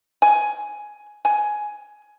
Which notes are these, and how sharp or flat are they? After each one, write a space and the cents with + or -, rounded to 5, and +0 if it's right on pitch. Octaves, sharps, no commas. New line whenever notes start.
G#5 +10
G#5 +10